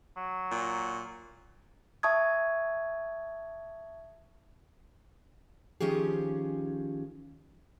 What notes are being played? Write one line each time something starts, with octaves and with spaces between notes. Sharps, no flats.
F#3
A#2
E5 A5 C#6 D#6 G#6
D#3 F3 C#4 G4 G#4